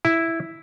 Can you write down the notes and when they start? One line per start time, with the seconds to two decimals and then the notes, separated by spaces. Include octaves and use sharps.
0.05 E4